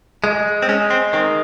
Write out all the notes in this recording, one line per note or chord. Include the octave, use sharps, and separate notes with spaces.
G#3
C4
G#3 C#4
C4
D#3 C4